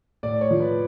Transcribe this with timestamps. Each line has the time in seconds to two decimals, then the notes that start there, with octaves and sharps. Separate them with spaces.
0.23 A2 D5
0.41 C#5
0.51 F3
0.60 B4